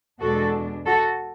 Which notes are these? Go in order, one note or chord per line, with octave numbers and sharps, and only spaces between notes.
E2 B2 G#3 D4 F#4 A4
F#4 A4